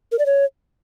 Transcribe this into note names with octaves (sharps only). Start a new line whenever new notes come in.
A#4
D5
C#5